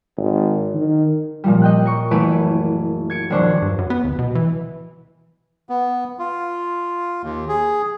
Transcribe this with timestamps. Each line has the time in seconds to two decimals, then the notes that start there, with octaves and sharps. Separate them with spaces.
0.18 G#1
0.74 D#3
1.44 A#2 F3 G3
1.62 D#5 G5 F#6
1.85 A#4 C#6
2.11 F#1 E3 A3 B4 D7 D#7
3.10 G#6 C#7 D7
3.30 D#1 F3 D4 C5 C#6
3.62 G2
3.79 F#2
3.90 B3
4.04 D1
4.19 B2
4.35 E3
5.69 B3
6.19 F4
7.23 D#2
7.49 G#4